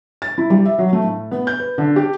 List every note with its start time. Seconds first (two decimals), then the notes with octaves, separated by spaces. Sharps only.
0.22 A6
0.38 E4
0.50 G3
0.65 E5
0.79 F#3
0.93 A3
1.04 A2
1.31 B3
1.47 G6
1.60 B4
1.78 D3
1.96 G4